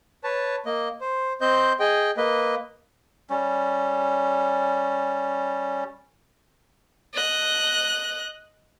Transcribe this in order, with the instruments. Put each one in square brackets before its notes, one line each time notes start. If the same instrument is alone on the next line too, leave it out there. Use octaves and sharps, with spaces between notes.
[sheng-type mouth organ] B4 C#5 A5
A#3 D#5
C5
C4 C5 D#5 G6
G#4 D#5 G5
A#3 B4 D#5
[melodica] G3 C#4
[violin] D#5 F#6